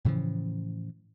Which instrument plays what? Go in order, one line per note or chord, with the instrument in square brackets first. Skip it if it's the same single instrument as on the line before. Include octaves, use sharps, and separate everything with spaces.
[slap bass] A2 C#3 E3 F3